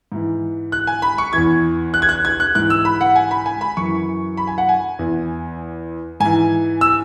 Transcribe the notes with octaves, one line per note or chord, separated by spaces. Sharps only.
G#2 E3
F#6
G#5
B5
C#6
E2 E3 G#6
F#6
G#6
F#6
G#6
F#6
G#2 E3 F#6
E6
B5
F#5
G#5
B5
G#5
B5
F#2 E3 C#6
B5
G#5
F#5
G#5
E2 E3
G#2 E3 G#5
E6